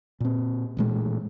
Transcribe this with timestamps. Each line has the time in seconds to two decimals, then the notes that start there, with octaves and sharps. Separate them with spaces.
0.20 A#2 C4
0.77 A1 A#2 G#3